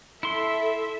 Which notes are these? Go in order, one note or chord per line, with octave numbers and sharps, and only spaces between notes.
E4 A4 E5 C6